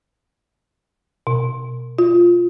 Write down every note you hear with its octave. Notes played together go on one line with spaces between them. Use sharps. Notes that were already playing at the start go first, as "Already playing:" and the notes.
B2
F4